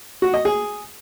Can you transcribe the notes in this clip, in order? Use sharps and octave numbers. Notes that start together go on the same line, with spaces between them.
F#4
D#5
G#4